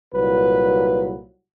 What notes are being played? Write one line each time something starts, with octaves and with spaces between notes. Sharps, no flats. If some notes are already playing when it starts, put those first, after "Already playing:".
C2 A#2 F#3 B4